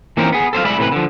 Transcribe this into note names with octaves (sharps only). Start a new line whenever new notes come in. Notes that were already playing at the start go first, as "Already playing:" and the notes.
E3 A#3 C4 C#4 D#4 A#4
B3 G#4
A4 C5 C#5 F5
G#3 D5 E5 B5
A2 C3 E3 B4
D3 F3